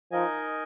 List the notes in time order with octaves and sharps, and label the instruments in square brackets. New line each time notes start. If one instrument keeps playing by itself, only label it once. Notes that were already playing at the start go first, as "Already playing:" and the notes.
[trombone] F3 [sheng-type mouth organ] D#4 A#4 D#5 G#5